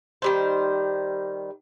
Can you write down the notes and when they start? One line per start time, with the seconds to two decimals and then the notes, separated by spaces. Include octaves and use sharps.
0.22 D#3 G3 C5